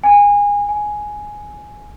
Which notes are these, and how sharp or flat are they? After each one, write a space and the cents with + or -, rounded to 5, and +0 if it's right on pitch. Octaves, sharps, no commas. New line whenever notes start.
G#5 -25
G#5 +5